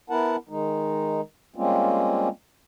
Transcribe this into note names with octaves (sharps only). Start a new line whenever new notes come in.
B3 E4 A#4 F#5 A5
D#3 G#3 D#4
G3 G#3 A#3 C4 C#4 F4